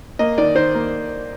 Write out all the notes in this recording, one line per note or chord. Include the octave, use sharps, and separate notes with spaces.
A#3 D#5
D#3 D5
D#3 C5
A#3